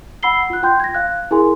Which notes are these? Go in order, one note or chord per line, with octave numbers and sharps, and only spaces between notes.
F#5 B5 E6 C7 G7
F4 F#6
F4 G5 C6 G6
G#6 A#6
F5 F#6
E4 G#4 A#4 G#5 C6